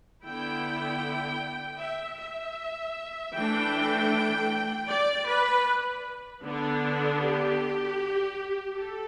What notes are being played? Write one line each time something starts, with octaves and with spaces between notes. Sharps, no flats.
D3 B3 E4 G5
E5
E5
E3 A3 D4 G5
D5
B4
D3 B3 D4
G4
A4